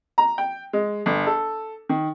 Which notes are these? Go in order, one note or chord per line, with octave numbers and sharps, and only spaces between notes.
A#5
G5
G#3
G1
A4
D#3